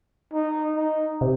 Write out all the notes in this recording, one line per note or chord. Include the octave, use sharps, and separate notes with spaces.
D#4
D#4
C3